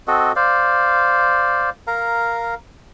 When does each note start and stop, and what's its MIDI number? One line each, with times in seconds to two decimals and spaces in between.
0.07 0.32 60
0.07 0.32 66
0.07 0.32 69
0.07 0.32 75
0.36 1.70 72
0.36 1.70 74
0.36 1.70 77
1.87 2.55 70
1.87 2.55 77
1.87 2.55 82